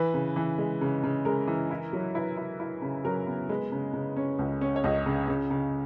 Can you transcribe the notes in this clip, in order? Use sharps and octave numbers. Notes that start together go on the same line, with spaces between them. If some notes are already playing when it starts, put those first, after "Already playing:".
Already playing: E3 B4
C#3
E3
G#3
C#3
C#3
G#3 A#4
E3
E4
F#3
E4 B4
E4
E4
C#3
F#3 A#4
B3
G#3 B4
C#3
C#3
C#4
C#2
C#4
C#5
C#2 D#5
C#3
C#3
C#3